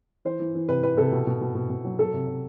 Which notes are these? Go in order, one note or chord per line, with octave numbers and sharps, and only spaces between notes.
E3 C5
E3
E3
C3 B4
E3 B4
C3 A4
B2
B2
B2
B2
B2
F#3
F#3 A4
C3
C3